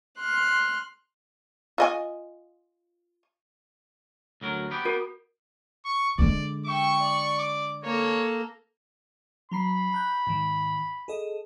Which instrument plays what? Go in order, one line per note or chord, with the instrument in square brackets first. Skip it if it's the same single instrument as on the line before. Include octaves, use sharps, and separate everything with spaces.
[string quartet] C6 F6 F#6
[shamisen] F4 D#5 G#5
[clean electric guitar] D2 F#3 A#4
B3 G4
[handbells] F#4 A#4
[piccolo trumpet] C#6
[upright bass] D3 G#3 [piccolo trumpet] D5
[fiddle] E5 G5 [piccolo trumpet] C#6
[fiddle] D5
[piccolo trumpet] D6
[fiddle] A#3 A4 [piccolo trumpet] C#5
[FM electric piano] F#3 A#5 C7 [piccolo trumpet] B5
[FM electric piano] A#5 F#6 G6
G#2 D#3
G#4 A4 D#5